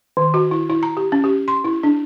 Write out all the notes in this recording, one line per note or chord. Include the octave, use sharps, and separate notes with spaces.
D#3
F#4
E4
E4
A#5
G4
C#4
G4
C6
E4
D4